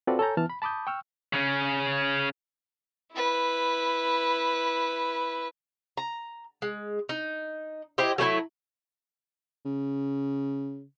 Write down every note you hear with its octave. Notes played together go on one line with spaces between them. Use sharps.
C4 F4 F#4 A4 B4 D5
A4 C#5 G#5 A#5 G6
E3 B3 A5 F6
B5
A5 B5 D6 D#6 G6
G5 C#6 E6 F6
C#3 C#4
E4 B4
A#5
G#3
D#4
E4 G4 C5 D#5
F#3 A3 C4 E4
C#3